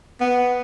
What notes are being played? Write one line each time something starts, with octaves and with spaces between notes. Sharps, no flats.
B3